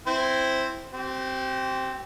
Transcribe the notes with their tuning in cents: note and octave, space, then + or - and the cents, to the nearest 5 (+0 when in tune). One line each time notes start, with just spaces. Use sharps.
C4 +0 E4 +0 C5 +0
C4 +0 G4 -45